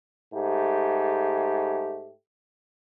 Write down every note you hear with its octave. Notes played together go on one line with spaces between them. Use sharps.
G#2 A3 G4